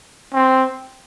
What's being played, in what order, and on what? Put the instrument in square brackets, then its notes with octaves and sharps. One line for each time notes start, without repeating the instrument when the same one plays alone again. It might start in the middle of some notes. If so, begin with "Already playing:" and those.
[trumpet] C4